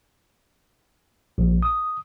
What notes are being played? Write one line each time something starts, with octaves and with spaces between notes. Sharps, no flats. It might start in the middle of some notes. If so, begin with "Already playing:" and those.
A#1
D#6